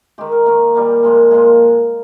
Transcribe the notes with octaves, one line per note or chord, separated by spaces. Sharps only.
D#3 G#3 G4
A#4
D#3 A#3 A#4
A#2 G3 A#3
A#2 F3 G#3
A#2 F3 G#3 G#4